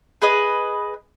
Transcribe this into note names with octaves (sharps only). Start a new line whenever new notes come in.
G#4 B4 D#5